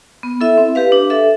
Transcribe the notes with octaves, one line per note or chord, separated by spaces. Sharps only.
B3
E4 A4 E5
C4
G4 B4 F5
D4
A4 E5